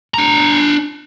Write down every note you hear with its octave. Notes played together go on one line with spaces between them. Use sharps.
D4 A#5